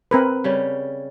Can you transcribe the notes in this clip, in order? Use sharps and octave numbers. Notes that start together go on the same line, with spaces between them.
C4 A#4 B4
C#3 G3 C#4